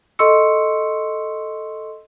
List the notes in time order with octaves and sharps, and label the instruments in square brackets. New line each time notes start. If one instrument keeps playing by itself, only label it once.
[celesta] A4 D#5 C6 C#6 E6 C#7